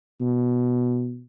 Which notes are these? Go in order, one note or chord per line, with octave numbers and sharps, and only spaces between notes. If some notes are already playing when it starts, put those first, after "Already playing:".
B2